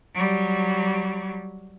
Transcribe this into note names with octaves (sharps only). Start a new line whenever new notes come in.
F#3 G3